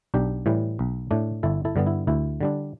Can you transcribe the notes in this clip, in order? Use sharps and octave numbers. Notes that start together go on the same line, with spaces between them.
B1 D4 G4
A2 E3 G3
B1
A2 A3 D4
G1 E4 A4
E4 A4
G2 D3 G3 B3
E4
D2 E4
D3 G3 D4